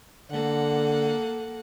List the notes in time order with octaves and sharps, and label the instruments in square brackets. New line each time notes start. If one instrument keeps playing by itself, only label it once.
[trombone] D3 [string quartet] A#3 A4 F#5